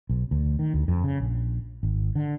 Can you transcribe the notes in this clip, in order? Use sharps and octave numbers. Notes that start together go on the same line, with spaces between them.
B1
D2
D#3
D2
F2
C#3
A#1
G#1
D3